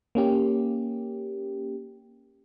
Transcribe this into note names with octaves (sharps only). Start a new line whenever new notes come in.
A#3 C#4 G4